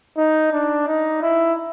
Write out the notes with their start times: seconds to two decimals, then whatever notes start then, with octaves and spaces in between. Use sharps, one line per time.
0.18 D#4
0.53 D4
0.87 D#4
1.22 E4